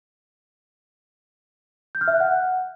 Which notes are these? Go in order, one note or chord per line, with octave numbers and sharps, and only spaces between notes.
G6
F6
E5
F#6
F#5